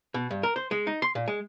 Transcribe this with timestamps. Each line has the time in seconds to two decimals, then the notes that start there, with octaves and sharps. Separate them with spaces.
0.14 B2
0.31 G2
0.43 A#4
0.56 C5
0.71 G#3
0.87 D#4
1.02 C6
1.15 A#2
1.28 G#3